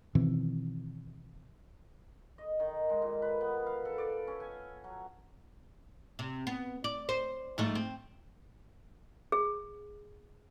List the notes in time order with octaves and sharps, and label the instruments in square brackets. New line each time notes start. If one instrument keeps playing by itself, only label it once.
[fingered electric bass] B2 D#3 E3 C4
[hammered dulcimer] D#5
D#3
G#3
A#2
B4
B3
F5
A4
D5
C#4
G#5
F#3
[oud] C3
B3
D5
C5
G#2 F3 A3
C4
[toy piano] G#4